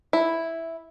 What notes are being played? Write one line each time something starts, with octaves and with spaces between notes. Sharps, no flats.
E4